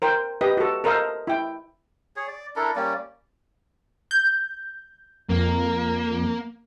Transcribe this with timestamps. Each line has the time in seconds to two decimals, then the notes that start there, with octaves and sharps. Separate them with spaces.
0.02 A#4 C5 G5
0.41 G4 B4 D#5
0.57 F#4 A4
0.84 A4 A#4 C5 D#5 F5
1.27 E4 G5
2.16 G#4 C#5
2.28 D5
2.56 D4 E4 A4 A#4
2.76 G3 A#3 C#4 D5
4.11 G6
5.29 F2 A#3